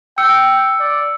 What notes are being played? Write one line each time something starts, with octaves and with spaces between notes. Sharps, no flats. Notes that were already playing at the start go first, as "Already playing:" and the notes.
G5 E6 C#7
D5